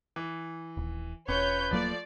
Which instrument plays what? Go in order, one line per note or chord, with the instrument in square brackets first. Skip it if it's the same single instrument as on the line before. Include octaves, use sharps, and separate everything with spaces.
[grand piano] E3
[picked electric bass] D#1
[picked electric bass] E1 [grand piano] C#4 F4 [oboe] B4 [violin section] C#5 G6
[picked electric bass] D#1 F#3 A#3 [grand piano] F3 A3 [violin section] D5